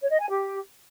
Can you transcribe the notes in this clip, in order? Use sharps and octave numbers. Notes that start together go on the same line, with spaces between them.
C#5
D#5
G#5
G4